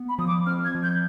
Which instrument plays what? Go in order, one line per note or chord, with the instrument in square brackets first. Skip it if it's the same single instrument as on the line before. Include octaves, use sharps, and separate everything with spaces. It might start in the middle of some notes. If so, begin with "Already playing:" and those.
Already playing: [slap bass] B3
[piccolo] B5
[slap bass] F3 [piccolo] D#6
[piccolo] D6
[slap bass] C4 [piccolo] F6
[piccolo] G#6
[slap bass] F3
[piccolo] G6